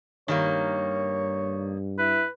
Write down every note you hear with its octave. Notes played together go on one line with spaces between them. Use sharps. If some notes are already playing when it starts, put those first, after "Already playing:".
G2 D#3 G3 A#3 C#5
E4 B4